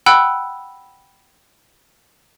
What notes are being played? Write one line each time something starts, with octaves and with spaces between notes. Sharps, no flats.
F#5 G5 B5 E6 F#6